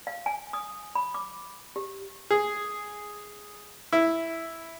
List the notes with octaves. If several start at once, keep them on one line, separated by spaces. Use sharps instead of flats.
F5
G#5
D#6
B5
D6
G4
G#4
E4